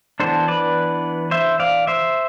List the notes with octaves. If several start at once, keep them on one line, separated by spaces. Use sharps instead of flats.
E3 B3 D4 A4 C5
B4 D5
C5 E5
D5 F5
C5 E5